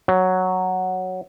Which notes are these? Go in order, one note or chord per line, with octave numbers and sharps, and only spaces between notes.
F#3